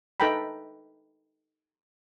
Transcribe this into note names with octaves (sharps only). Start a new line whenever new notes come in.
D#4 A4 B4 G5 A#5 B5